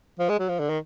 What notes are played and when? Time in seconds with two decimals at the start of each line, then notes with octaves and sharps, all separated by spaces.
0.19 F3
0.29 G#3
0.39 F#3
0.49 F3
0.59 D3
0.69 D#3